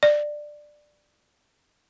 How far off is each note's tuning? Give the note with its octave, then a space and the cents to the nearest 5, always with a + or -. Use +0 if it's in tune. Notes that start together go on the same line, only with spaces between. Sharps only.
D5 +15